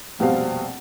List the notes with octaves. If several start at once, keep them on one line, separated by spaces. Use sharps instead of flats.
F1 A#1 B2 G3 C4 F5